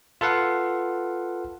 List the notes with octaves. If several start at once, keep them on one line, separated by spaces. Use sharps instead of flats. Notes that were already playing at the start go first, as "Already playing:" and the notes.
F4 A4 B4 F5 F#5